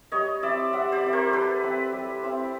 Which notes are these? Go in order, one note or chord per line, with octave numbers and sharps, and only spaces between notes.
G3 C#5 D#5
C4 E4 D5 E5
G3 E5 F#5
C5 D5
C4 E4
A#4 C5
G3 A4 B4
C4 E4
G3
C4 E4